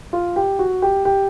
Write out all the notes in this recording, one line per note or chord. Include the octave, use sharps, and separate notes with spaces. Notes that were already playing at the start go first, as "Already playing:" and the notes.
F4
G4
F#4
G4
G4